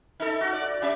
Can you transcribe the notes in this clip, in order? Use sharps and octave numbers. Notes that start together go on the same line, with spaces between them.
D#4 A4
F#4
D5
G3 C#4 E5